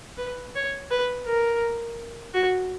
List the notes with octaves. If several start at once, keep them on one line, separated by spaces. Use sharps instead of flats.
B4
C#5
B4
A#4
F#4